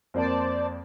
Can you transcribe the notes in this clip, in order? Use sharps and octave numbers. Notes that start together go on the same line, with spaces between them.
F2 A#3 C5 D5 A5